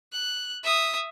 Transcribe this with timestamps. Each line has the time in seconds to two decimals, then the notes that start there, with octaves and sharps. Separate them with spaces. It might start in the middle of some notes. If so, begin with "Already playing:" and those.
0.13 F#6
0.63 E5 D#6